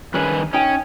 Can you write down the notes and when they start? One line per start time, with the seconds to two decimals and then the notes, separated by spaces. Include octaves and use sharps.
0.14 G2 D#3 C#4 G#4 B4
0.53 C#4 D#4 G5 G#5